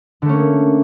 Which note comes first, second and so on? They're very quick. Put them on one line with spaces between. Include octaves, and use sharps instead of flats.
D3 A3 C#4 A#3